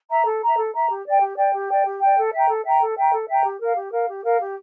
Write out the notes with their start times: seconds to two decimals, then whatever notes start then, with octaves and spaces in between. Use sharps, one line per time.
0.09 E5 A#5
0.26 A4
0.42 E5 A#5
0.57 A4
0.73 E5 A#5
0.89 G4
1.05 D5 G5
1.20 G4
1.36 D5 G5
1.53 G4
1.68 D5 G5
1.84 G4
2.01 D5 G5
2.17 A4
2.32 E5 G5 A#5
2.48 A4
2.64 E5 G5 A#5
2.81 A4
2.96 E5 G5 A#5
3.12 A4
3.28 E5 G5 A#5
3.43 G4
3.60 A#4 F5
3.76 G4
3.92 A#4 F5
4.08 G4
4.24 A#4 F5
4.40 G4